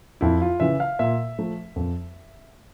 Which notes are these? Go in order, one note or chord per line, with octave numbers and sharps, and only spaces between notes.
F2 E4
F4
C#3 E3 E5
F5
A#2 E5
F3 A3
F2